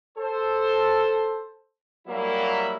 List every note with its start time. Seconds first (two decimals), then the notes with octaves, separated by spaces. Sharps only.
0.18 A4 C5
2.08 F#3 G3 A#3 E4